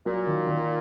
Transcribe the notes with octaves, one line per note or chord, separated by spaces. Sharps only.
A#2 F#3
D#3
D#3